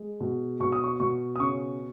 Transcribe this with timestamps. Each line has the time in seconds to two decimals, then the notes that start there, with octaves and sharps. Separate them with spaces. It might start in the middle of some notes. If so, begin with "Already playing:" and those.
Already playing: G#3
0.20 B2
0.60 B2 C#6
0.72 D#6
0.84 C#6
1.00 B2 C#6
1.36 D#6
1.39 C#3 C#6